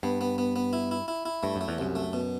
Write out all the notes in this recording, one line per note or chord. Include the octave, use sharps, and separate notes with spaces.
G2 B3
B3
B3
B3
E4
E4
E4
E4
G2 A3
F#2
A3
E2
C2 F#2
A3
B2